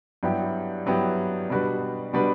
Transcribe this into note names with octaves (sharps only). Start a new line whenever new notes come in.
G2 F#3 B3 E4 G4
G2 F#3 B3 E4 G4
B2 G3 D4 F#4 B4
B2 G3 D4 F#4 B4